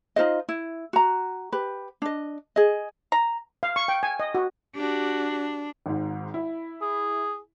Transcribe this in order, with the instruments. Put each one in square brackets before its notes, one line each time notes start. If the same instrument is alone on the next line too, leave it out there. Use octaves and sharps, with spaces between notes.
[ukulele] D#4 F4 C5 D#5
E4
F#4 A#5
G4 B4
D4 D#5
G#4 D#5
[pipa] A#5
[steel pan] F5
C#6
G5
G#5
D#5
F#4
[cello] D4 [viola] F#4 G4
[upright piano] G#1 G#2
E4
[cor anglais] G#4